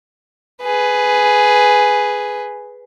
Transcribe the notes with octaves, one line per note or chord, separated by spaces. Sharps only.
G#4 B4